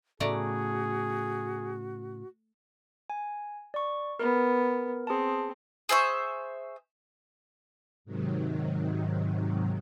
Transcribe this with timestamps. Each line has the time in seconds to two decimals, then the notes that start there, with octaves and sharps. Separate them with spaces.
0.20 A2 C#3 A3 F#4 G#4 D5 A#5
3.10 G#5
3.74 D5 C#6
4.19 B3 A#4
5.07 C4 G#4 A5
5.89 G#4 C5 E5 C#6
8.05 G#2 C3 D#3 F#3